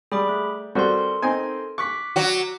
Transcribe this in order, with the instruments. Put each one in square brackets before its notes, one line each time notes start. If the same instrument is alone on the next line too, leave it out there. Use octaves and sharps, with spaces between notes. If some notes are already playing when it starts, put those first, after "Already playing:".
[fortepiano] G3 [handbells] G#4 B5 D6
[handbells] A3
[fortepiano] G3 C4 F#4 [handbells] A4 A#4 C6
[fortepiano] C4 D#4 G#5
[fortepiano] C#6 [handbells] D6 F#6 B6
[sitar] F#3 F#4